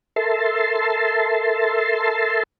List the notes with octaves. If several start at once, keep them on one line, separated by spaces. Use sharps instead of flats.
A4 A#4 E5 A5 C6